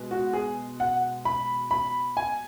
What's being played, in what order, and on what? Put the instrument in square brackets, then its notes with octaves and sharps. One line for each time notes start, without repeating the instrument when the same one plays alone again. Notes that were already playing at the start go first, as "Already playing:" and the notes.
Already playing: [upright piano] B2 G#3
F#4
G#4
F#5
B5
B5
G#5